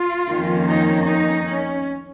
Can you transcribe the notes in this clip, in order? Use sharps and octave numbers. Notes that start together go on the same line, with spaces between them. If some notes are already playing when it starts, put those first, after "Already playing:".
Already playing: F4
F2 D#3 A#3 C#4
D#4
D#4
C#4